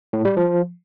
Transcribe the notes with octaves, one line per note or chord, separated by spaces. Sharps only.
A2
G3
F3